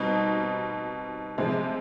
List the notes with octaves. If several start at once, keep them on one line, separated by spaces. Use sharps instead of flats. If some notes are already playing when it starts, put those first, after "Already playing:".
Already playing: B2 G3 C4 D#4
C3 F3 G#3